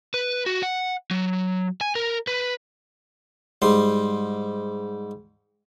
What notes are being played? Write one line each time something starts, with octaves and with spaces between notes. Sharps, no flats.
B4
F#4
F#5
F#3
G#5
A#4
B4
G#2 G3 C6